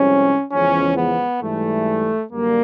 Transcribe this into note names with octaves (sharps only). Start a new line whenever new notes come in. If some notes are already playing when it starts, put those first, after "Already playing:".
Already playing: C2 C3 F3 G#3 C#4
E2 C#3 F3 G#3 C#4
B3
G#2 E3 G3 A3
F#2 D3 G3 A#3